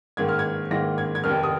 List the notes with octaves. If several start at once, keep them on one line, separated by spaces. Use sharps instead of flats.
G#2 D#3 A#3 G#6
F6
G#6
G#2 D#3 A#3 A#6
G#6
G#6
F1 D#2 D#3 F6
D#6